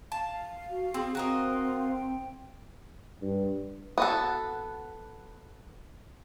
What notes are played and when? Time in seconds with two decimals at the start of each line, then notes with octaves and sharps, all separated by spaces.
0.12 F5 A5
0.70 F#4
0.94 C4 G#4
1.15 C4 F#4 A#4 D#5
1.92 G5
3.22 G2
3.98 B3 F#4 A4